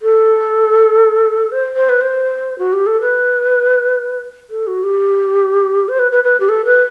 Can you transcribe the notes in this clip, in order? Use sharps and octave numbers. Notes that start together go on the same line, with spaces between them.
A4
C5
C5
B4
C5
F#4
G4
A4
B4
A4
F#4
G4
C5
B4
B4
B4
G4
A4
B4